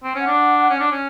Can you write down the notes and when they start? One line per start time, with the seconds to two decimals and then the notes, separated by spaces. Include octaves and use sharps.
0.03 C4
0.15 C#4
0.20 F#5
0.26 D4
0.70 C#4
0.80 D4
0.91 C#4